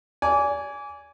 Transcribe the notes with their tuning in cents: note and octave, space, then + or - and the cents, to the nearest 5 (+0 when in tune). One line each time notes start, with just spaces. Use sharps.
D5 -30 G#5 +0